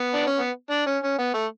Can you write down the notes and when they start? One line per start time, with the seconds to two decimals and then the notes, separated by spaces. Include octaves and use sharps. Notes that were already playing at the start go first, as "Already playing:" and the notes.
Already playing: B3
0.14 D4
0.27 C#4
0.39 B3
0.71 D4
0.87 C#4
1.03 C#4
1.19 B3
1.34 A3